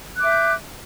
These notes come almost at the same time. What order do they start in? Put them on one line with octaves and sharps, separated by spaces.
F#6 D6 E5 G6